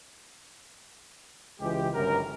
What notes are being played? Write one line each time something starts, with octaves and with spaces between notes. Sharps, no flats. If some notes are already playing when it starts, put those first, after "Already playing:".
C#2 E3 G#3 G4
G1 C#2 F#2 A#4